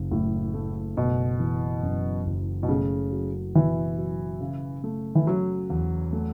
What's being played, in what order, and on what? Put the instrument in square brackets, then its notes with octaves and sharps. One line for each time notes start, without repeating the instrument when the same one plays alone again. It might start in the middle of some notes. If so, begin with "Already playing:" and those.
Already playing: [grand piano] F#1 C#3
[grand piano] F#1 [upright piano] A2
[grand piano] A3
[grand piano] F#1 [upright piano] B2
[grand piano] E3
F#2
F#1
[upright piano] B2
[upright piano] C#3 [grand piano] A3
[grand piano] F#3
[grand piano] B2 [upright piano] E3
[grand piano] F#3
C#3
A3
[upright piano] E3
[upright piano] F#3 [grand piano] C#4
[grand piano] E2
A3